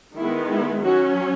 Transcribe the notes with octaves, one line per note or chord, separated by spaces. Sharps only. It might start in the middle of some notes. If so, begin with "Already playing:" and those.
D#3 G#3 B3 E4
E4
F#3 C#4 F#4